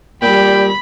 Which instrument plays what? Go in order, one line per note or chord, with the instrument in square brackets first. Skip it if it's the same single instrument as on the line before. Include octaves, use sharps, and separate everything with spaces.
[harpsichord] A#2 [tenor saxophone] G3 [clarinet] G5 [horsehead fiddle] B5